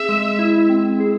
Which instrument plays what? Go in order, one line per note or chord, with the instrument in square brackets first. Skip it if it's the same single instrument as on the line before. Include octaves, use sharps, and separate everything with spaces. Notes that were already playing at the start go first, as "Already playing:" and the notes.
Already playing: [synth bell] C4 G#4 [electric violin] E5
[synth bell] G#3
E4
C4
G#4